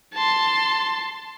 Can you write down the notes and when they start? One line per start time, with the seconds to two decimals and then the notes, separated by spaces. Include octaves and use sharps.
0.14 A5 C6